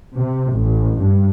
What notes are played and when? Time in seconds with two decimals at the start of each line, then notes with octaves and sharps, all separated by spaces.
0.17 C3
0.51 A1
0.99 G2